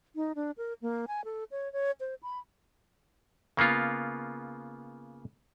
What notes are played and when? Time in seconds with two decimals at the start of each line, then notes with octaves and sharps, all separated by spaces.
0.16 D#4
0.36 D4
0.58 A#4
0.82 A#3
1.08 G#5
1.25 A4
1.51 C#5
1.73 C#5
2.00 C5
2.23 B5
3.57 C#3 A#3 B3 F4